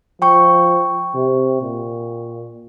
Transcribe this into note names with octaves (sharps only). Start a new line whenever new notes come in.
F3 G5 C#6
C3
A#2